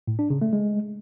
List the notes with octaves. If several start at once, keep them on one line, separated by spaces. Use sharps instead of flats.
A2
D4
C#3
A3
G#3